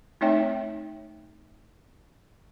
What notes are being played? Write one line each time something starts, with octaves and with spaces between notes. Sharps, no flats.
A3 C4 D#4 C#5 E5 G5